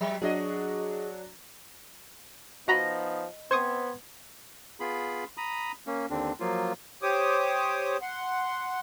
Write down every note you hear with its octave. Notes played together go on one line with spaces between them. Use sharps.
F#3
F#3 D4 F#4 G#4 D#5
F3 B3 D#4 F#4 D#5 A#5 B5
B3 C4 C5 C6 C#6 D#6 G#6
B3 F4 G#4 B5
A#5 B5 D#6
A#3 C#4
D#2 D3 C4 D4
F3 F#3 A#3 F4
G4 C5 C#5 D6 D#6
F#5 C6